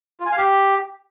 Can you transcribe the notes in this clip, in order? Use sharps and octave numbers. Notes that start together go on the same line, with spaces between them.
F4
G#5
F5
G4